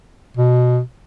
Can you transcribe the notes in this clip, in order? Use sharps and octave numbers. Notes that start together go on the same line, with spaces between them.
B2